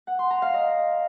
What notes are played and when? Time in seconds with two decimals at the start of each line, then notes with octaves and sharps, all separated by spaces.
0.07 F#5
0.19 C6
0.30 A#5
0.42 F5
0.54 D#5